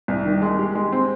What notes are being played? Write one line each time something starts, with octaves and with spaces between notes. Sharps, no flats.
C2
D#3
G#3
G4
G#3
C4